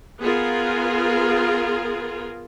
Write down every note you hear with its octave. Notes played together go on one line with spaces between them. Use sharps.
B3 F4 G#4 A#4